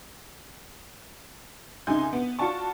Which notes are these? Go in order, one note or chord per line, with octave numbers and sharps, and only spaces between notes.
C2 C#3 D#4 G#5 C6 G6
B3
F4 F#4 D5 A5 C#6